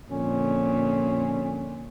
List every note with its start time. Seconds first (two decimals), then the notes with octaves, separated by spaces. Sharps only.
0.11 F2 A#2 D3 C#4